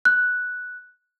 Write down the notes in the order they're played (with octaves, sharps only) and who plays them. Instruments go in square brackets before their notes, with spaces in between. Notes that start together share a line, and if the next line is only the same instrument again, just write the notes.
[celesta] F#6